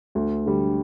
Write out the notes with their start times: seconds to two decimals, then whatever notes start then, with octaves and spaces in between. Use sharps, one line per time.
0.15 D2
0.46 D3 G3